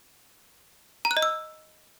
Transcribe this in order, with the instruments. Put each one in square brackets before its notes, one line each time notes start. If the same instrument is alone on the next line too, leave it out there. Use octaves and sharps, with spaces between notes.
[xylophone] A#5
F#6
D#5
E6